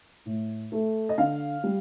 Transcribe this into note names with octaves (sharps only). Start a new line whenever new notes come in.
A2
A3
D#5
D3 F5
G3